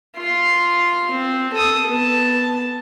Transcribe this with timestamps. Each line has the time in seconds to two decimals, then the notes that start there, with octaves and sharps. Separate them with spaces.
0.17 F4 C6
1.11 C4
1.53 A4 D#6
1.87 B3 A5